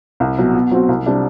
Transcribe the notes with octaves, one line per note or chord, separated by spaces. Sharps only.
C2
B2 F#3
B2
F#3 C4 F#4
C2
C3 G3 D4